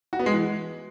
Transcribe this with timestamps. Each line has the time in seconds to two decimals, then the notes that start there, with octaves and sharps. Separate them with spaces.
0.13 F#4
0.19 B3
0.26 G#3
0.33 E3